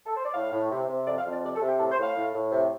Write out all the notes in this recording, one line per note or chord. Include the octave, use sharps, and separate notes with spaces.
A4
C5
D5
A2 F5
A2
C3
C3
F2 D5
F5
F2
D5
C3 D5
A4
C3
G4
A2 A4
C5
A2
F5
A2
A2
C3